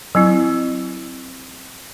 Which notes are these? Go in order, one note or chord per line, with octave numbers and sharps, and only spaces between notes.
F#3 C4 E4